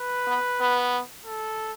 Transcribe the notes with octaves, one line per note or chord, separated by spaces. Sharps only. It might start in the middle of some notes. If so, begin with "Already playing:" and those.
Already playing: B4
B3
B3
A4